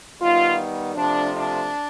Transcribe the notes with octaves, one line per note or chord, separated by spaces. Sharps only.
D#3 G3 B3 F4
C3 F3 A3 D4
D4